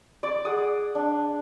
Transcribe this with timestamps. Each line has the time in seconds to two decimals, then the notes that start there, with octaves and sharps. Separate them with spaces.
0.23 D5 D6
0.45 G#4 F#5 D#6
0.95 D4